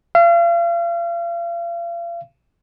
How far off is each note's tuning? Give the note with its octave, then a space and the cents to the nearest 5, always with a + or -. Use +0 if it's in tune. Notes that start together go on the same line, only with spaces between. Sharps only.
F5 -40